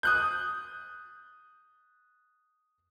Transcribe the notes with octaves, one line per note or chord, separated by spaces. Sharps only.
D#6 F#6 G6